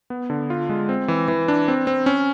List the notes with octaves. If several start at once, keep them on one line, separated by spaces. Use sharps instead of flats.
B3
D3
F4
G#3
C4
E3
E3
D4
C4
C4
C#4